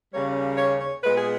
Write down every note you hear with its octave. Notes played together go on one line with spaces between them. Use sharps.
D#2 C#3 G3 A#3 C#4 C#5
C#5
C#5
A#2 G#3 B3 B4
G#4